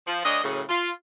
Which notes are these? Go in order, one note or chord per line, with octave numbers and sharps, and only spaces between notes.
F3
D2 D4 C#5 D#5
F#2 A2 C#3
F4